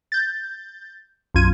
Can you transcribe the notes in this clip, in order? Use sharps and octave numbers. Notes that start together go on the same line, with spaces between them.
G6 A6
B1 F#2 F4 G#6 D#7